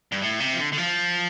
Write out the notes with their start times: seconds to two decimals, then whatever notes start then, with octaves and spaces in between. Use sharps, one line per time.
0.12 G2
0.22 A2
0.40 C3
0.53 F3
0.59 D3
0.73 D3
0.78 F3